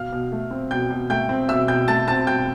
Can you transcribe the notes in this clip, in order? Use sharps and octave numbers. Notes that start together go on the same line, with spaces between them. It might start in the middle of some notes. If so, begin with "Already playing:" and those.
Already playing: B2 F5 F6
B2
A3
C4
B2 G5 G6
B2
A3 G5 G6
C4
B2 E5 E6
B2 G5 G6
A3 A5 A6
C4 A5 A6
B2 G5 G6